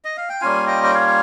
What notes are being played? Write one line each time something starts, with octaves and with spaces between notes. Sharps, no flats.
D#5
F5
G5
G3 A#3 C#4 F4 F5 G#5
D#5 G5
G5
C#5 F5